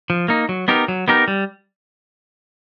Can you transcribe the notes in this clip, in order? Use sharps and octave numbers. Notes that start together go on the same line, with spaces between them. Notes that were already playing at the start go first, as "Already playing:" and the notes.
F3
A#3 D#4
F#3
B3 D#4 G4 A#4
F#3
B3 D#4 G4 A#4
G3